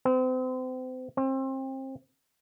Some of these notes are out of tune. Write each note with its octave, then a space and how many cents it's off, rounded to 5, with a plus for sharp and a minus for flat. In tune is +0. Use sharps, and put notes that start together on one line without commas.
C4 -35
C4 +30